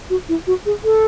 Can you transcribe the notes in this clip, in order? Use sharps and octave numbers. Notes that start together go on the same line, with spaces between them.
F#4
E4
F#4
G#4
A4